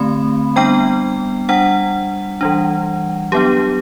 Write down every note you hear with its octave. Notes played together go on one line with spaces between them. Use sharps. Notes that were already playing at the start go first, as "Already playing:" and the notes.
Already playing: D3 A3 C4 B5
G3 B3 D4 G5
G3 D4 F#5
E3 G3 D4
F#3 B3 D4 G4